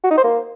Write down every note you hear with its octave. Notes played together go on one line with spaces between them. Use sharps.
F#4
D#4
C5
A#3